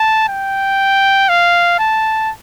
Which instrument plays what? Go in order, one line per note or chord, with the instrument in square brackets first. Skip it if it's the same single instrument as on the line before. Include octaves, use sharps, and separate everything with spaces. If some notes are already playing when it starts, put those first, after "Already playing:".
Already playing: [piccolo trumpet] A5
G5
F5
A5